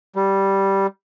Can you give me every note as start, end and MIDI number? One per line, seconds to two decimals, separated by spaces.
0.16 0.87 55